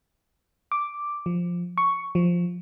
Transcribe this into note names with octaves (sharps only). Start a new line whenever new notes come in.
D6
F3
C#6
F3